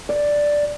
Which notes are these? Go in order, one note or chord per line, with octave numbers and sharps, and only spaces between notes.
D5